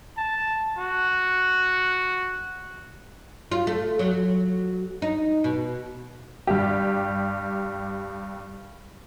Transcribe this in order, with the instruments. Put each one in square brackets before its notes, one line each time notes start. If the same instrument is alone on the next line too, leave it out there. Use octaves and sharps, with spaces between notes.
[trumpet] A5
F#4
[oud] F4
A3
F#3
D#4
B2
[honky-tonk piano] G2 G4